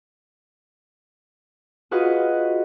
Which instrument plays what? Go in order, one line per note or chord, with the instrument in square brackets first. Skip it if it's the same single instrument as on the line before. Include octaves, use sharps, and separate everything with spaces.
[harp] F4 F#4 G#4 B4 D#5